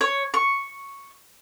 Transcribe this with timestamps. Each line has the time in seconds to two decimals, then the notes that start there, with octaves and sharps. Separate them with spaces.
0.01 C#5
0.34 C#6